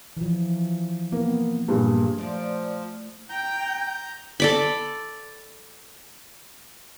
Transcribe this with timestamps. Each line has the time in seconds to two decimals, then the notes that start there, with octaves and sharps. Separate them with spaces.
0.17 E3 F3
1.12 A#3 B3
1.68 G2 A#2 G3 G#4
2.18 A#2 F3 A3 D5
3.29 G5 A#5 G6
4.40 A4 D5 B5